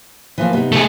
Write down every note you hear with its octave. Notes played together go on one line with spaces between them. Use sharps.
E3 F3 A#3
C3 B3 D#4
A3 G#4